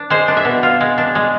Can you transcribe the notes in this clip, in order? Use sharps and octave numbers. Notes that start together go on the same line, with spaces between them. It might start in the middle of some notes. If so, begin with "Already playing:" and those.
Already playing: D4
G#3 C5
D4
E5
B2
F4
G#3
D4
G#3